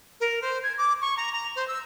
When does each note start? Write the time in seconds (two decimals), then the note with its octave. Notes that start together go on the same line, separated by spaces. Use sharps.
0.20 A#4
0.41 C5
0.63 G#6
0.77 D6
1.01 C#6
1.17 A#5
1.32 A#5
1.55 C5
1.67 E6